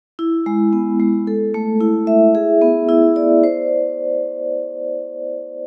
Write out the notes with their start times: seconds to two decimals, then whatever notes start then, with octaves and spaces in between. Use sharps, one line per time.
0.19 E4
0.46 G#3
0.73 B3
1.00 G#3
1.27 A4
1.54 A3
1.81 E4
2.07 E5
2.35 G#4
2.62 B3
2.89 E4
3.16 D5
3.44 C5